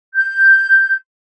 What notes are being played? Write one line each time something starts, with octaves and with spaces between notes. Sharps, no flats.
G6